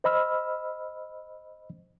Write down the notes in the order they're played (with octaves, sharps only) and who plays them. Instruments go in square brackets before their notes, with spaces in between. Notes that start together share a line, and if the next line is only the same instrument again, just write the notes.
[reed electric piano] C5 D#5 B5 E6 F6